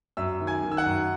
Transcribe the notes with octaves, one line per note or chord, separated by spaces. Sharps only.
F#2 E5 E6
D#3
G#5 G#6
D#3
E6
F#5 F#6
F#2